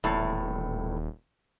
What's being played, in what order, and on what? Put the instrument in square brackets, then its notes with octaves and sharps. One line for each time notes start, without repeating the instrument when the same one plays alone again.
[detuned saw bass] D#1 [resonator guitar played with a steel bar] E2 A2